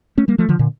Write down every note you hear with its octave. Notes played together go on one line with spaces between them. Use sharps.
A3 C#4
G3 A#3
F3 A3
D3 F3
A#2 D3